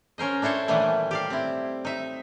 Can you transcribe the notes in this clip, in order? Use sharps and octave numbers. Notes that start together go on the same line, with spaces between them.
C#4 A#4 C5 D#5
D4 E4 A4 C5 C#5
A#2 D#3 E3 G3 A3
G4 D5 F5
C4 E4
D#4 E5